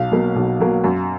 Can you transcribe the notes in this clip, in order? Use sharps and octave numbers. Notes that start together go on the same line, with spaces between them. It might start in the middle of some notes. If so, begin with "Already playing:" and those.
Already playing: B1 F5
B2 F#3 A#3
B1
B2 F#3 A#3
F#2